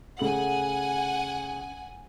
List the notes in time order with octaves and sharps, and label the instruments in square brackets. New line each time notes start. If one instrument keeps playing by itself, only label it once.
[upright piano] C#3 A3 F#7 [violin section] F#5 G#5